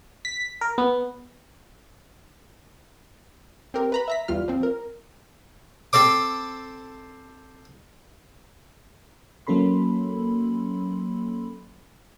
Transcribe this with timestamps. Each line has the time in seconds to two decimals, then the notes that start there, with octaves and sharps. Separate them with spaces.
0.25 B6
0.61 A#4
0.78 B3
3.74 C4 G4 A#4
3.92 B4 A#5 B5
4.08 E5 A#5 B6
4.28 E2 G3 F4 F6
4.48 F3 C4
4.63 A#4
5.93 C4 A4 C5 D6
9.47 F#3 A#3 C#4 A4 B5 C6